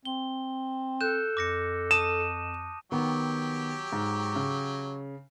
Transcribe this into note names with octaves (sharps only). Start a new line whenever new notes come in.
C4 G7
A4 F#6 G6 E7
F2 D6 A#6 C#7
A5 D#6 D#7 E7
D#3 F#3 B3 G4
G#2
C#3